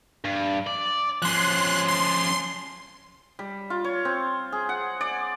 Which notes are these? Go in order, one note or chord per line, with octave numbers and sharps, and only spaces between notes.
G2
D5
F3 C#4 C6 F#6
C6
G3
F4
C#5
C4
G#4
F#5
D5